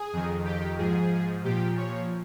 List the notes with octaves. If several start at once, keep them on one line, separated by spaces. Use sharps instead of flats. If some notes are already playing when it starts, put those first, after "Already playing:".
Already playing: G#4
F2 D#3
G4
G#2 F3 G#4
A#2 F3 G4
C#5